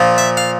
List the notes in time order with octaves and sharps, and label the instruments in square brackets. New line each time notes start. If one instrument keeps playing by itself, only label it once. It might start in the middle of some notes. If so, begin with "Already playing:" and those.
Already playing: [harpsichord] A#2 F3
E5
F5